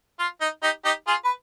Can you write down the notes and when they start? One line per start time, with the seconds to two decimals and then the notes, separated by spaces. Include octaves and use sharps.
0.19 F4
0.41 D#4
0.63 D#4 G4
0.85 D#4 G4
1.07 F4 G#4
1.25 B4